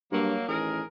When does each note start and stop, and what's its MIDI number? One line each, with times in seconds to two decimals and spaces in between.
0.12 0.35 43
0.12 0.45 54
0.12 0.45 58
0.48 0.81 33
0.48 0.84 51
0.48 0.84 68
0.48 0.84 70